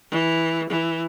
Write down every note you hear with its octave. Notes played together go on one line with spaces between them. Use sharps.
E3
E3